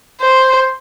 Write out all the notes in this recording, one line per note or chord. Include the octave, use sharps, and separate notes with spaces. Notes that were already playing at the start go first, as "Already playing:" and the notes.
C5